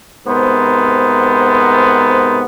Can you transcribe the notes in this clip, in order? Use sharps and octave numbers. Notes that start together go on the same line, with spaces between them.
G#2 C3 B3 A#4 C5